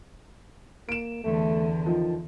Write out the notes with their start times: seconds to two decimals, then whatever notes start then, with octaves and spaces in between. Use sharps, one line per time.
0.89 A#3 D7 E7
1.24 E2 D3 A3
1.86 D#3 F3